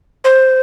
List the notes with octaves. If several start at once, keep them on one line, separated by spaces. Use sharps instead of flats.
C5